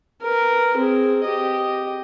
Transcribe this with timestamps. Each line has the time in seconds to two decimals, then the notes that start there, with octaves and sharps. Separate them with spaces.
0.22 A#4 B4
0.77 C4 G#4
1.24 G4 D#5